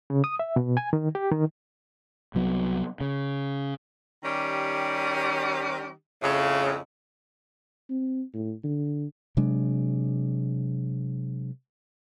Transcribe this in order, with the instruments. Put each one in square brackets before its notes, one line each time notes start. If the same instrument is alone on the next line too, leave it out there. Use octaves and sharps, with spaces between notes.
[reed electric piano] C#3
D#6
E5
B2
G#5
D#3
G4
D#3
[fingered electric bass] C2 F#3 B3
C#3
[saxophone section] D#3 G3 C#4 G4
F2 A2 C#3
[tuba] C4
A2
D3
[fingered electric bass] C3 F#3 G#3 D4